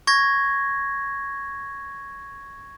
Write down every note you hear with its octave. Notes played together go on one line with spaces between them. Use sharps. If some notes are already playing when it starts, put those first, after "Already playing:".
C#6 G#6 A#6